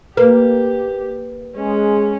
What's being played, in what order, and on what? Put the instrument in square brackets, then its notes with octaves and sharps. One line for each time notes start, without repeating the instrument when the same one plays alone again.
[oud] A#3 [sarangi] G4 [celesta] B4
[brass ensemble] G#3 [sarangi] C#4